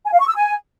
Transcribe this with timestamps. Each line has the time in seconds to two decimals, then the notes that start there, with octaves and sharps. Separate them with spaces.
0.05 G#5
0.13 F5
0.20 C#6
0.27 E6
0.35 G#5